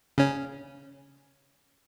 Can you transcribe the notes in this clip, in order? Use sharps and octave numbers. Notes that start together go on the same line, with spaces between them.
C#3 C#4